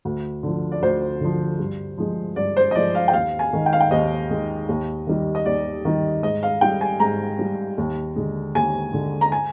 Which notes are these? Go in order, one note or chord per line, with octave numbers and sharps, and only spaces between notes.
D2
D3 F3
D5
D2 C5
D3 F3
G2
F3 G#3
G2 D5
C5
D#5
F3 G#3 D5
F5
G5
D#2 F5
G#5
D#3 G#3
G5
F5
G5
D#2 D#5
D#3 G#3
D#2
D#3 G3
D#5
D#2 D5
D#3 G3
G#2 D#5
F5
G3 G5
G#5
G#2 A#5
G3
D#2
D3 G#3
D#2 G#5
D3 G#3
A#5
G#5